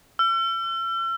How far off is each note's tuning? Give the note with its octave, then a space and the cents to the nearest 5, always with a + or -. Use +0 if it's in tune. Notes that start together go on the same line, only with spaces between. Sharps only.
E6 +45